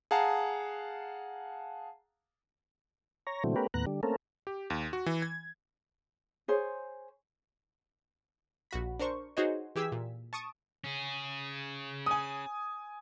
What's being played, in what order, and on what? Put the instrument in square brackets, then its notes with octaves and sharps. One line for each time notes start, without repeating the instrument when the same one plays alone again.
[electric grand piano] G#4 F5 F#5 A5 A#5
[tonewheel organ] C#5 A#5
A#2 D3 E3 F#3 A3 C4
A3 B3 C#4 G4 A#4 B4
D#2 A2 B3 A#5 F#6
D3 G3
A3 A#3 C4 C#4 A4 A#4
[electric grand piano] G4
D#2
F#4
E3
G#6
[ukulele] G#4 C5 C#5
[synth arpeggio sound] A#1 F#4 B5
D4 A#4 C5 C#6
D#4 F#4 G#4 C5 C#5 D#5
E3 G4 G#4 E6 G#6 B6
A#2
A5 C#6 D#6 D7 E7
[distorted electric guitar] C#4 G#4
[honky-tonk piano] G#5 D#6